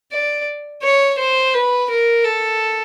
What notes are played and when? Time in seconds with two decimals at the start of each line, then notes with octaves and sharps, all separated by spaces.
0.12 D5
0.83 C#5
1.18 C5
1.53 B4
1.90 A#4
2.25 A4